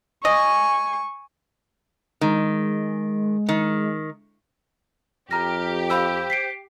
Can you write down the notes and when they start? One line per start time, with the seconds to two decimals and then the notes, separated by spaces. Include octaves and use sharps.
0.25 D#5 G#5 C#6
2.21 D#3 G#3
3.49 D#3
5.31 F2 G4 A#5 F6 A#6
5.90 C5 F5 B5 E6
6.30 B6 C7 D7